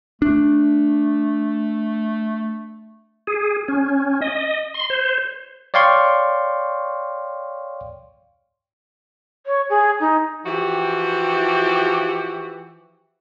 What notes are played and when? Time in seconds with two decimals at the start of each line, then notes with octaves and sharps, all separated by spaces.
0.22 A3 D4
3.27 G#4
3.68 C#4
4.22 D#5
4.74 C6
4.90 C5
5.74 C#5 D5 F5 G5 C6 C#6
9.46 C#5
9.70 G#4
10.00 D#4
10.46 E3 F3 F#4 G4